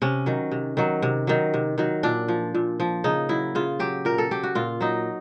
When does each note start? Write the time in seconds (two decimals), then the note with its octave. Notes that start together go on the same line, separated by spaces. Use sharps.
0.02 C3 C#4
0.26 D#3 F#3
0.51 C3
0.77 D#3 F#3
1.02 C3
1.27 D#3 F#3
1.54 C3
1.78 D#3 F#3
2.03 A#2 D4
2.28 F3
2.55 A#2
2.80 F3
3.04 C#3 D#4
3.29 F#3 E4
3.55 C#3 F4
3.79 F#3 G4
4.05 A#2 A#4
4.18 A4
4.31 F#3 G4
4.43 F#4
4.55 A#2 F4
4.81 F#3 D#4